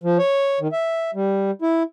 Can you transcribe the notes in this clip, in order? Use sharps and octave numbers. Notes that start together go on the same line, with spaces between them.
F3
C#5
D#3
E5
G3
E4